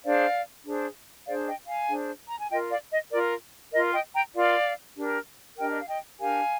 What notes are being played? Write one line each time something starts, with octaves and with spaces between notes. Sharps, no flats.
D4 G#4 C5 D5 F5
D4 G#4 C5
D4 G#4 C5 D5 F5
D#5 G5
F5 G#5
D4 G#4 C5
A#5
G#5
F4 A#4 D#5 G5
D5 F5
D#5
F4 A#4 D5
F4 A#4 D#5
D#5 G5
G5 A#5
F4 A#4 D5 F5
D4 G4 A#4
D4 G4 A#4 D#5 G5
D#5
F5
D#5 G5
D4 G4 A#4 F5 G#5